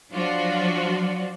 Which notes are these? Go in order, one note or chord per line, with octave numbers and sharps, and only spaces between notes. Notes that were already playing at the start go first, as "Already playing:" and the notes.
F3 F#3 D4 F4 F#4